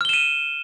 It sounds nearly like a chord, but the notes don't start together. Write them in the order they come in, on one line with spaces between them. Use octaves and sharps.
F6 G7 E7 D#7